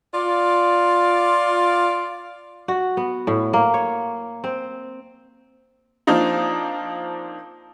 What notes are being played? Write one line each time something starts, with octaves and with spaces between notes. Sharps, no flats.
F4 D5
F#4
B3
A2
A#3
C#5
C4
F3 A#3 C4 D4 D#4 F4